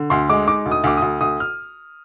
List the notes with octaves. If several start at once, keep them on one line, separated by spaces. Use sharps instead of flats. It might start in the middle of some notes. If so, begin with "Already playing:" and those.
Already playing: D3
D2 C6
G#3 D6
D#4 D6
D2
D#6
D2 D6
D2 D#6
D2 D#6
F6